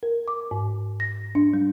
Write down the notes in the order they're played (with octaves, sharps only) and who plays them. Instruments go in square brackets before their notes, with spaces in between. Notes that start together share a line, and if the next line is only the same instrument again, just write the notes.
[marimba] A#4
D6
G#2
A#6
D4
G3